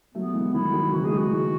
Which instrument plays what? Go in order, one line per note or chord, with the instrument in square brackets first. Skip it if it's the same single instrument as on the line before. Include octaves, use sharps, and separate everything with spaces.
[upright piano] F#3 A3 [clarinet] B3
[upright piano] E3 G#3
[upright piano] D#3 F#3 [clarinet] E4
[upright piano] D#3 F#3
[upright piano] C#3 E3 [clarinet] F#4
[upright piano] G#3 [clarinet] G#4
[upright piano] D#3 F#3
[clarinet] F#4
[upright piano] E3 G#3